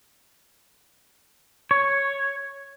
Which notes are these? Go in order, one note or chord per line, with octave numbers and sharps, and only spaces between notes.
C#5